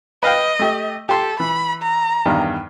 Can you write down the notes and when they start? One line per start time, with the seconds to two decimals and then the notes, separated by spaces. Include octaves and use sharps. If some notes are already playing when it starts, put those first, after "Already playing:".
0.23 B4 D#5 F5 G5
0.59 A3 G4
1.09 G4 A4 C6
1.40 E3 B5
1.82 A#5
2.26 E2 G2 D#3